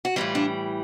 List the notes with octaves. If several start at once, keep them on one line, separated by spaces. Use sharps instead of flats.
F#4
A2 E3 G3 F4
D4